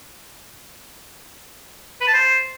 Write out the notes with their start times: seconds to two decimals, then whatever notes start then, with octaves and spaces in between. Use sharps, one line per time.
2.01 B4
2.07 A5
2.14 C5